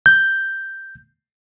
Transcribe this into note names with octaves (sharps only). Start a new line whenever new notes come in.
G6